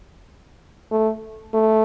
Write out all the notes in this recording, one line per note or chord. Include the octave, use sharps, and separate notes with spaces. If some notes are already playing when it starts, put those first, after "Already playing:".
A3
A3